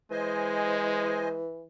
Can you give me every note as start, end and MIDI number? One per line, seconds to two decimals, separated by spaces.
0.11 1.66 52
0.11 1.43 56
0.11 1.29 72
0.11 1.29 75
0.11 1.29 80